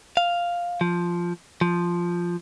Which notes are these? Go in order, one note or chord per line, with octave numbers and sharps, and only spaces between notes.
F5
F3
F3